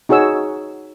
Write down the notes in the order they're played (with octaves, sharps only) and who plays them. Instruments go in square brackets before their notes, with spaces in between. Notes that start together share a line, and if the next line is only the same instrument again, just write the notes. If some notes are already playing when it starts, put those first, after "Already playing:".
[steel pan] D#4 F#4 G#4 C#5 E6